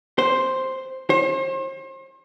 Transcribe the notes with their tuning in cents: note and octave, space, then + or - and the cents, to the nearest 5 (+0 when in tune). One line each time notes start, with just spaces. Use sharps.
C5 +5
C5 +40